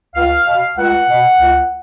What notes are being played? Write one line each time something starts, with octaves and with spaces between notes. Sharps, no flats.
C#2 F5
B2
C#2 F#5
B2
C#2